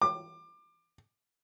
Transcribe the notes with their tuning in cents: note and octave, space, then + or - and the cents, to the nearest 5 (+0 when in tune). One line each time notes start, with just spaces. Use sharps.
D6 +25